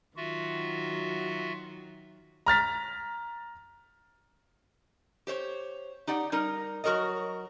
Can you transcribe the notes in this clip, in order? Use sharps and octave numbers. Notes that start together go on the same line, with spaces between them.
D#3 F#3 F4 F#4 E5
A#5 F6 A6 B6
G4 C5 C#5
D#4 G4 D5 F#5
G3 D#4 A#4
F#3 F#4 A#4 C#5 D#5